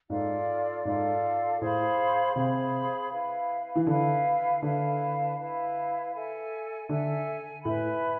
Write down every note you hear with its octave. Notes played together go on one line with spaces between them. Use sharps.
G#2 F4 A4 D5 F5
G#2 F4 A4 D5 F5
A2 G#4 C5 F5 B5
C3 G#4 C5 F5 B5
E4 B4 F5
E3
D3 E4 B4 F5
D3 E4 B4 F5 A5
E4 B4 F5 A5
A4 E5 G#5
D3 A4 E5 G#5
A2 B4 E5 G#5 B5